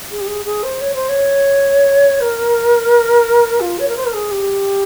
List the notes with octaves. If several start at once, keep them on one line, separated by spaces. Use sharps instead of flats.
G#4
G4
G#4
G#4
C5
C#5
C5
C#5
A#4
F4
C#5
A#4
C5
A#4
G#4
G4